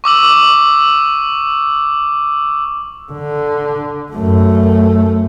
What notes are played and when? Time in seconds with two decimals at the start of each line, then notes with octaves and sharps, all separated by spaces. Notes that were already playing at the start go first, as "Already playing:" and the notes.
0.04 C#6 D6 E6 F#7
3.12 D3
4.12 F#2 A3